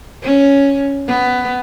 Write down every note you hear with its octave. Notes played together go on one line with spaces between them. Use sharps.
C#4
B3